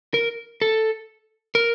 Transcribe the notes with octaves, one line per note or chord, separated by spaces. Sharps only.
A#4
A4
A#4